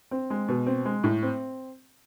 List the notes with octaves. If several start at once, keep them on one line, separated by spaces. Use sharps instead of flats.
C4
G#3
B2
C4
G#3
A2
C4